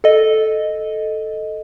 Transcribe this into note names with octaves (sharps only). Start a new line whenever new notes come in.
A4 D#5